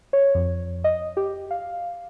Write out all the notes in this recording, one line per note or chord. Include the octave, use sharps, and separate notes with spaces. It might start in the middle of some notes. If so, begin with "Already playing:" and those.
C#5
F2
D#5
G4
F5